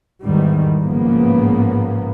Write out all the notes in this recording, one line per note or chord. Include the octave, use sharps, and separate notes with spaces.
E2 G#2 D#3 E3 G3
A1 G#2 C#3 F3 A#3 B3